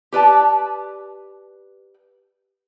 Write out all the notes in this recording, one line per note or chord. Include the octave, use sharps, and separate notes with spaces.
G4 B4 D5 A5